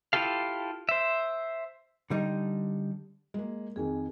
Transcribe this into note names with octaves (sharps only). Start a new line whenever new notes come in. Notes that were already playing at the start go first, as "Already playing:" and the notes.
E4 F4 G4 A4 F5
C5 E5
D3 G3 D#4
G#3 A#3
F2 D#3 G#4 G#5